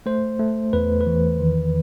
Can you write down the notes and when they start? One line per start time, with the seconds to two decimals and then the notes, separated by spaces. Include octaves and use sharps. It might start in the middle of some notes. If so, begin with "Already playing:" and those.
0.06 A3 C5
0.40 A3
0.73 E2 B4
1.01 B4
1.07 E3
1.40 D#3